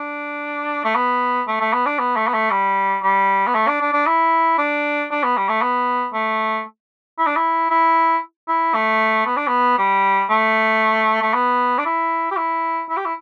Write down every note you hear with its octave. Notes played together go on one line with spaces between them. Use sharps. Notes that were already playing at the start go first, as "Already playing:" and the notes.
Already playing: D4
A3
B3
A3
A3
B3
D4
B3
A3
B3
A3
G3
G3
B3
A3
D4
D4
D4
E4
D4
D4
B3
G3
A3
B3
A3
E4
D4
E4
E4
E4
A3
B3
D4
B3
G3
A3
A3
B3
D4
E4
G4
E4
E4
G4
E4